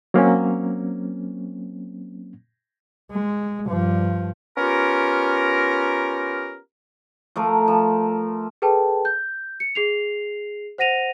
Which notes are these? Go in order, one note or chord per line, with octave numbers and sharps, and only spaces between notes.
F#3 A#3 C4 C#4
G#3
G2 F3
B3 C#4 F4 G4 A#4
F3 A3 A#4
F3
G#4 A4 B4 G5 A5
G6
C#7
G#4 C7 F7
C5 F#5 A#6 D#7 F7